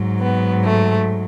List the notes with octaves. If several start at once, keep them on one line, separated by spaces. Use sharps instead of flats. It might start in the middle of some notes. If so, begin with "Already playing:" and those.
Already playing: G#2 F#3
B3
A3